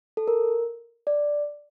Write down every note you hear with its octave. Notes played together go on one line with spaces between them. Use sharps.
A4
A#4
D5